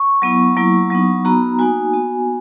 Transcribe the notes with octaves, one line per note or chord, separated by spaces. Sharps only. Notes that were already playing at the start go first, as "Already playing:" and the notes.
Already playing: C#6
F#3 B3 E4
F#3 A#3 E4
F#3 B3 D#4
B3 D#4 F#4 A#5
A#3 D#4 F#4 G#5
B3 F#4